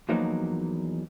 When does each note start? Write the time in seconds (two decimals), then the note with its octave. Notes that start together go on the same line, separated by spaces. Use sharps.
0.09 E2 F3 F#3 A#3 D#4